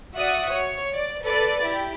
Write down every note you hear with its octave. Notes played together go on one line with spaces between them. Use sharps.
F#4 D5 E5 D#6 F#6
C#5
D5
A4 B4 D5
E4 G4